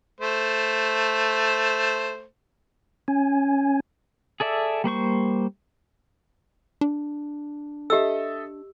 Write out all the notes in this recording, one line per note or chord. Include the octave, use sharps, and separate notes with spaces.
A3 C5
C#4 G#5
G#4 A4 D5 E5
G3 A#3 C5 C#6
D4
G4 A4 D#5 E5 E6